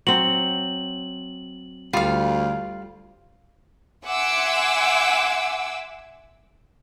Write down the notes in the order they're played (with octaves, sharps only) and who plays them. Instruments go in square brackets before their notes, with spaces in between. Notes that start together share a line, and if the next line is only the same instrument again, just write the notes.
[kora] F#3 C4 [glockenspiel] F#7
[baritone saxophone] D2 [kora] G3 [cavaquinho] F4 F5
[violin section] E5 F#5 G#5 C6 D6 E6